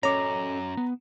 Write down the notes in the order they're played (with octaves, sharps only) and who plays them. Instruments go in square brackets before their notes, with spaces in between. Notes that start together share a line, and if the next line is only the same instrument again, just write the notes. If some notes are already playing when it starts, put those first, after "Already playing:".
[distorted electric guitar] F#2 [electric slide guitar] C#4 A4 D#5 [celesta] C#5 D6 [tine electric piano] A#5
[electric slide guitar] B3